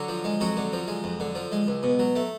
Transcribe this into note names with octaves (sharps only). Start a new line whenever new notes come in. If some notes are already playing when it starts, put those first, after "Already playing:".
Already playing: D3 F#3 F#4
F3
G#3
F2 F#3 F#4
D3
F3
G#3
F2
D3
F3
G#3
C#2
B2
F#3
A3